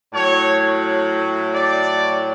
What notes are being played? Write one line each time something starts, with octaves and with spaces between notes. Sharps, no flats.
A2 F#3 C#5
D5